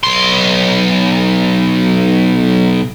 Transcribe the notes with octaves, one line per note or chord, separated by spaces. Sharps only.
B1 C6